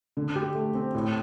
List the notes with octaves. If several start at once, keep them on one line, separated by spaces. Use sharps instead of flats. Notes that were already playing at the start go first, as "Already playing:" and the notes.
D3
G4
A3
C4
A2